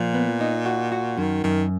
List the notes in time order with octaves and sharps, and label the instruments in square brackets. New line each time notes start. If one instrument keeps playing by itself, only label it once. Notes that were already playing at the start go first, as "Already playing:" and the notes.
Already playing: [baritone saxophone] A#2 [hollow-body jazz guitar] F3
[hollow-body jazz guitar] B3
D#4
F#4
F#4
[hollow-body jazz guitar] F#2 [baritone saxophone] D#3
[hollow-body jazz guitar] F#2 [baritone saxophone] D#3